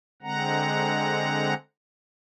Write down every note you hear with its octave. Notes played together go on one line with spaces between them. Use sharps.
D3 G#3 C4 F#5 A#5